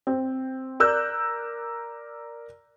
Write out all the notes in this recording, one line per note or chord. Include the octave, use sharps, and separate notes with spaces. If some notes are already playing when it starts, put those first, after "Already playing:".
C4
A#4 D5 E6 F#6 G6